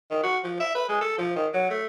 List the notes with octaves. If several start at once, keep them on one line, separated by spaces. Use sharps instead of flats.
D#3
F#4
F3
E5
B4
G#3
A4
F3
D#3
F#3
A3